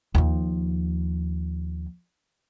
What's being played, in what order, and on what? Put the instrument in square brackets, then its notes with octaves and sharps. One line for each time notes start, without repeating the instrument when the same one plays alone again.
[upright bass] D#2 F3